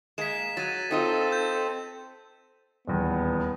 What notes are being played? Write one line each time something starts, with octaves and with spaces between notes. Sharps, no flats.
G#3 A#3 B6 E7
F#3 A6 D#7
C4 D#4 F4 A4 D#5
G6
D#1 E2 B3